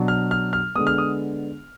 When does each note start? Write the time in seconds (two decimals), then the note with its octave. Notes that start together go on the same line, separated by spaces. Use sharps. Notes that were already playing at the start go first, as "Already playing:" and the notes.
Already playing: B2 F#3 D4
0.08 F6
0.31 F6
0.53 F6
0.75 D3 G#3 B3 D#6
0.87 F6
0.98 D#6